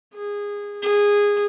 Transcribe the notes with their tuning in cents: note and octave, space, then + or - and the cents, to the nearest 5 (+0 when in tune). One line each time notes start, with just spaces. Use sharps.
G#4 -20
G#4 -15